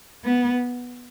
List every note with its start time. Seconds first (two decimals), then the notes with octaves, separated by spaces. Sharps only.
0.24 B3